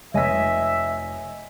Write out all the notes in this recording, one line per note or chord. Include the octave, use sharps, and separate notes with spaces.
F1 C#5 D#5 E5 G#5 B6